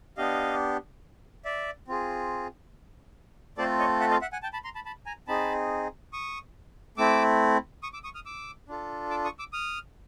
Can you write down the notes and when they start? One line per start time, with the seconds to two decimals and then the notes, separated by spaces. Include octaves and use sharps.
0.17 B3 D4 G4 D#5 F5
1.45 D5 E5
1.88 C4 F4 G#4
3.57 A3 C4 F4 A4 C5 D5
3.79 C#5 D#5
4.00 E5 F#5
4.10 D#5 F5
4.21 E5 F#5
4.32 F#5 G#5
4.43 G5 A5
4.53 A5 B5
4.64 A#5 C6
4.75 A5 B5
4.86 A5 B5
5.06 G#5 A#5
5.27 C4 D#4 G#4 A5 B5
6.13 C#6 D#6
6.97 A3 C4 E4 D6 E6
7.83 C#6 D#6
7.93 D6 E6
8.04 C#6 D#6
8.14 D#6 F6
8.26 D6 E6
8.68 D4 F4 A4
9.11 D6 E6
9.24 C#6 D#6
9.39 D6 E6
9.53 D#6 F6